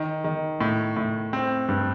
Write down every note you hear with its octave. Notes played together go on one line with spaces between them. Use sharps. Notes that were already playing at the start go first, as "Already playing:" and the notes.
Already playing: D#3
D#3
A2
A2
C4
G2